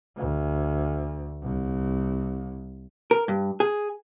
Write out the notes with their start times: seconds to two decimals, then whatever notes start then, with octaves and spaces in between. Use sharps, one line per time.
0.17 D2
1.42 C2
3.11 A#4
3.28 G2
3.60 G#4